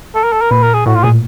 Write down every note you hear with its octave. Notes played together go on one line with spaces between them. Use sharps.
A4
A#4
A4
A#4
A#2 B4
A#4
G#4
A2 F#4
F4
A#2 G#4